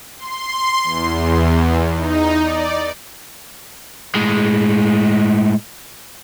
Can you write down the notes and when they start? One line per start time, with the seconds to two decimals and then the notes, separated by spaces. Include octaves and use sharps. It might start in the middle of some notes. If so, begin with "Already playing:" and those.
0.16 C6
0.83 E2
1.94 D#4
2.42 D5
4.15 A2 G#3